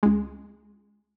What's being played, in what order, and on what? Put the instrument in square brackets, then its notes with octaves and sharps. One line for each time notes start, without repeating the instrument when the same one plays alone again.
[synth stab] C#2 G#3